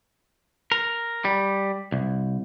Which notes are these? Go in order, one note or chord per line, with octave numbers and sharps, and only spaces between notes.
A#4
G3
C2